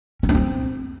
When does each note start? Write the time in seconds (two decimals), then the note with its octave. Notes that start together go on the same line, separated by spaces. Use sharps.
0.23 C#4
0.29 D4
0.35 C4